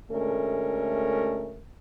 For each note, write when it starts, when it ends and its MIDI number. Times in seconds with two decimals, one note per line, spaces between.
0.11 1.62 38
0.11 1.62 56
0.11 1.62 57
0.11 1.62 61
0.11 1.62 69
0.11 1.62 70